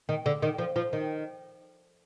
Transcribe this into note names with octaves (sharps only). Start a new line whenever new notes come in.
D#3
D3
D#3
F3
F3
D#3